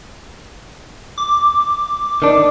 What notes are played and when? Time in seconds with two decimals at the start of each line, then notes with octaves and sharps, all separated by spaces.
1.18 D6
2.22 D#3 D4